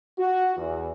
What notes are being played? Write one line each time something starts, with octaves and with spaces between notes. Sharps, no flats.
F#4
E2